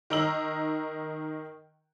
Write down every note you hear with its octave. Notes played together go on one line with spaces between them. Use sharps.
D#3 A#4 D#5 A#5 E6 F#7